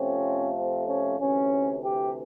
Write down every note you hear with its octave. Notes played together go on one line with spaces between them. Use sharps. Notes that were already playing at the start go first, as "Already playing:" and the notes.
Already playing: F2 C3 F3 A3 C4 C#4
C4
C#4
D2 C3 E3 C#4
G4